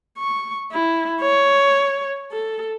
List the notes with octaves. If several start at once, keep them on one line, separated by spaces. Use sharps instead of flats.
C#6
E4
C#5
A4